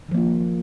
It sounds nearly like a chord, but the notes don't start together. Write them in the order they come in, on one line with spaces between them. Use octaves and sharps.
D#3 F3 A#3 F4